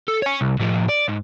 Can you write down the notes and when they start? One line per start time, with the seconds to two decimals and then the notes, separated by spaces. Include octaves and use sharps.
0.08 A4
0.22 C#5 G#5
0.41 C2
0.59 A2 F3
0.89 D5
1.08 G#2